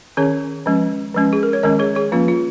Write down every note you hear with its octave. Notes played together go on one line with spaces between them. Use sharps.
D#3 C#4 G#4 C#5
F3 G#3 C#4
F3 G#3 C#4
G#4
A#4
C#5
D#3 G#3 C#4 A#4 D#5
G#4 C#5
G#4 C#5
F3 A#3 C#4 F4
F4